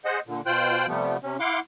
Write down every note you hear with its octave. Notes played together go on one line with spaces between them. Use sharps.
G#4 C5 D#5 F#5
A#2 D3
B2 F4 C5 G5 F#6
C3 F3 G3 A3 B3
C3 C#4
E4 F5 F#5 C6 D6